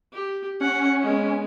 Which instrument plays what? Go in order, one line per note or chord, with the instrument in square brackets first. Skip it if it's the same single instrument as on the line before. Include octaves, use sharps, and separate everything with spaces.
[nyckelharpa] G4
[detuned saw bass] C#4 [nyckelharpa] F#5
[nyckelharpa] G#3 B3